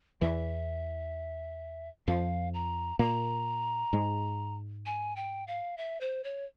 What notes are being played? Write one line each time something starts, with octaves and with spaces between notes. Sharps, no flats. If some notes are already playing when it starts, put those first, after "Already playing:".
E2 E3 E5
F2 F3 F5
A#5
A#2 A#3 A#5
G#2 G#3
G#5
G5
F5
E5
C5
C#5